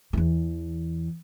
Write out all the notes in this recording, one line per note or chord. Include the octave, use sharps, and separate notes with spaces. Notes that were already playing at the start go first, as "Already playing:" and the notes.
E2 E3